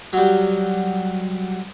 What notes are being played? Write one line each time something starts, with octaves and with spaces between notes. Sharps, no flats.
F#3 G3